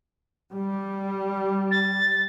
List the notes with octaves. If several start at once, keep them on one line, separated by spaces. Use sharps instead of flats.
G3
A6